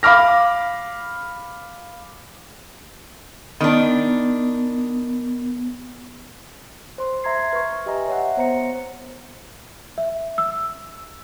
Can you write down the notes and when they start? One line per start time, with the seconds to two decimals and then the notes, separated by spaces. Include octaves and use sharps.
0.03 F5 B5 D6 F6 A#6
3.60 D#3 B3 D4
6.98 C5 C6
7.24 E5 A#5 C6 G#6 C7
7.53 B4 C#6
7.86 G4 D#5 E5 G#5 A#5
8.08 C#5 E5 F#5
8.37 B3 C5 A#5 C#7
9.98 E5
10.38 E6